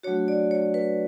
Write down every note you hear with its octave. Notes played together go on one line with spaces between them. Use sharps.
F#3 A3 D4 F#4 C#5
D5
C#5
B4